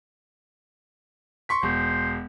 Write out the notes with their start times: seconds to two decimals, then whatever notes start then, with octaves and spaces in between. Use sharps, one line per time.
1.49 C6 C#6 B6
1.63 E1 C5